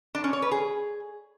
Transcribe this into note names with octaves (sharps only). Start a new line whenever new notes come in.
D4
C#4
C#5
B4
G#4